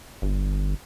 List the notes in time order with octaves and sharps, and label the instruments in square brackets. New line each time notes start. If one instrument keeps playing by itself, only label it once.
[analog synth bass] G1